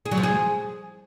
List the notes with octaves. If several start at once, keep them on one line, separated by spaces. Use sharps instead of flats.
G#4
F#3
F3
G#4